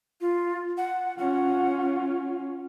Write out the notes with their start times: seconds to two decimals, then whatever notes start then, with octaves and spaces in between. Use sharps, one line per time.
0.21 F4
0.77 F#5
1.18 C#4 F4 F#5